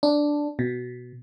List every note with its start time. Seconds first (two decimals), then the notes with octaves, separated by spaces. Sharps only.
0.03 D4
0.59 B2